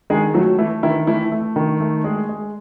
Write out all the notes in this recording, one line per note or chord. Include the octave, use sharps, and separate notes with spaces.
D#3 G#3 G#4
F#3 A3 F#4
E3 A3 E4
D#3 E3 E4
E3 A3 E4
A3
D#3
A3
G#3 G#4
G#3